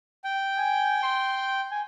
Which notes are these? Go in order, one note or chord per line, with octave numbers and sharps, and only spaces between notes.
G5
G#5
C6
G#5